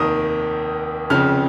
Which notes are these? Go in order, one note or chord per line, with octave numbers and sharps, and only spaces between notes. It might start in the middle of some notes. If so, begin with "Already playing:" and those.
Already playing: F1 D#2 D#3 D#6
F1 F2 C#3 F6